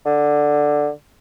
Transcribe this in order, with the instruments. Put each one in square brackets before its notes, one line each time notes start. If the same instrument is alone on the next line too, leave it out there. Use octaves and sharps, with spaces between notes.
[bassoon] D3